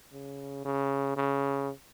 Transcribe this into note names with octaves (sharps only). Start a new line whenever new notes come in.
C#3
C#3
C#3